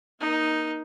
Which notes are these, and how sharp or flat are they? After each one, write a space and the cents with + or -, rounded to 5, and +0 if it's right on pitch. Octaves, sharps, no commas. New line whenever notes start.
A#3 +25 D#4 +0